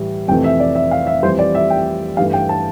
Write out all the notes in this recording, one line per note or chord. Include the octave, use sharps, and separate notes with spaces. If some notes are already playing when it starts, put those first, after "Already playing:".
Already playing: A2 E3 G3
F2 C3 E3 A3 G5
E5
D5
E5
F5
E5
F2 E3 G3 C5
D5
E5
G5
G2 E3 A3 F5
G5
A5